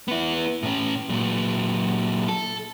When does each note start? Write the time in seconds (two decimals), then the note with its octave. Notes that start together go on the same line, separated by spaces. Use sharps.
0.08 B3 E4
0.63 A2 C#4
1.09 A#2 F#3
2.28 A4